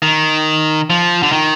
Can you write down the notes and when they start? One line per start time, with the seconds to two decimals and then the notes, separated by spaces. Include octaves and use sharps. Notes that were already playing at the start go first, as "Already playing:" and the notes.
0.02 D#3
0.90 F3
1.23 D3
1.32 D#3